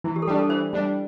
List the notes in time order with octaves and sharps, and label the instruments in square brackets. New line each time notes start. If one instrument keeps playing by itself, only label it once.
[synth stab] E3 [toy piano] E4
[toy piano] G4
A4
[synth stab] G3 D4 [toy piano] G4
[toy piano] A4
[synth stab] E3 [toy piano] C5
[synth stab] G3 D4